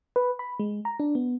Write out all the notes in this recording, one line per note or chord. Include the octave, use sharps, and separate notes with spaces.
B4
B5
G#3
A#5
D4
B3